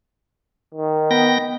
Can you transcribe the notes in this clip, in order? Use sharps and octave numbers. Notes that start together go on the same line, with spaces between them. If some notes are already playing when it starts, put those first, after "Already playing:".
D#3
B3 G5 A#6